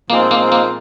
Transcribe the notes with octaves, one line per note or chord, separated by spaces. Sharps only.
A#2 F3 G#3 A#3 C4 D#4
A#3
A#3